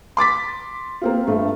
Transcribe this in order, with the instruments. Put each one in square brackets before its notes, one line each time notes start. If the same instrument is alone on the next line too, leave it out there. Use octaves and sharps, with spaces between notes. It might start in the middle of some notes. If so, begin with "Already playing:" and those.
[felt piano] C6 D6 A6 B6
A#3 C4 F4
G2 A3